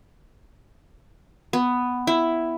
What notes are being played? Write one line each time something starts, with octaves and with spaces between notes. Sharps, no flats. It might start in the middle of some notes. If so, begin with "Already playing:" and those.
B3
E4